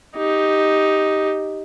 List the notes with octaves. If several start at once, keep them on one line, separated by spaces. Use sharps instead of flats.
D#4 G4